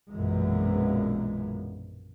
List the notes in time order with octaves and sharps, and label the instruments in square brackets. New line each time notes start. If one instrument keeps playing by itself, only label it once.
[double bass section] A#1 F#2 B2 E3 G#3